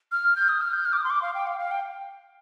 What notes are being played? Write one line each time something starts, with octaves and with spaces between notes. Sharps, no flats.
F6
G6
D#6
F6
G6
F6
D6
D#6
C6
D6
F5
G5
F5
F5
G5